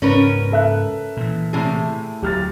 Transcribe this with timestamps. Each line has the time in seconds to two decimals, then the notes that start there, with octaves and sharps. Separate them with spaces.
0.02 G#2 C#3 C#4 A#4 B4
0.52 A4 E5 F#6
1.17 A#2 E3
1.53 A2 C3 G#4
2.22 D2 F#3 G4 F6 A6